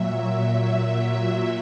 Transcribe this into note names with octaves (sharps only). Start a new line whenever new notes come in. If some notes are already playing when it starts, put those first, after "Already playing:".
Already playing: A#2 F#3 E5
E5